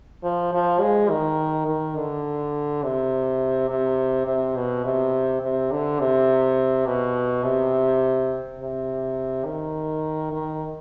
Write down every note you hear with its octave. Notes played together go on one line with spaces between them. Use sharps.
F3
F3
G#3
D#3
D#3
D3
C3
C3
C3
B2
C3
C3
D3
C3
B2
C3
C3
D#3
D#3